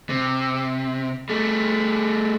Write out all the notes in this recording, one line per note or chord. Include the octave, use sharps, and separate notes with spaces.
C3
G3 A3